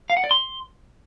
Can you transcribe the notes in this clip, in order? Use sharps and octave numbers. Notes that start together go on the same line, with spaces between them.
F5
F#5
D5
C6